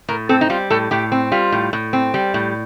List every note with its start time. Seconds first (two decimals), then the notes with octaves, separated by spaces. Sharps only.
0.09 A2 A#4
0.29 C4 A4
0.41 D#4
0.50 G3 F4
0.70 A2 A4
0.91 A2 G4
1.12 C4
1.32 G3 F4
1.52 A2
1.73 A2
1.93 C4
2.14 G3
2.34 A2